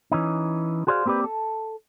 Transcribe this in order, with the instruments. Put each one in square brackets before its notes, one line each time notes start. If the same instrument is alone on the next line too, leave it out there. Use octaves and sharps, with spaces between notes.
[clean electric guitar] E3 C#4 D#4
F#4 G#4 C5 D5 E5 F5
A#3 C4 G4 B4 D5
A4